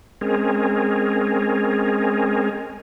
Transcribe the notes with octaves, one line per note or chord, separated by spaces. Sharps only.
G#3 C4 C#4 G#4 A#4